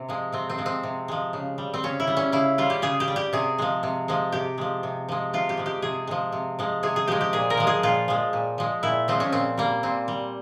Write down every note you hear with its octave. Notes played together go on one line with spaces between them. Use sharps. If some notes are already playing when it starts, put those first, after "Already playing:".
Already playing: C3
F3 G#3
C3 C4
C4
F3 G#3
C4
C3
F3 G#3
C#3
G3
C4
C#3 C#4
E4
G3
C#4
C#3 E4
G3 F4
G4
C#3 G#4
G4
G3
G4
C3 G#4
F3 G#3
C3
F3 G#3
C3 G4
F3 G#3
C3
F3 G#3
C3 F4
G4
F3 G#3
G4
C3 G#4
F3 G#3
C3
F3 G#3
C3 G#4
G#4
F3 G#3 G4
G4
A#2 G#4
A#4
F3 G#3
G#4
A#2 F4
F3 G#3
A#2
F3 G#3
A#2 E4
F3 G#3 C4
C#4
A#2 C4
G3 A#3
A#2 C4
G3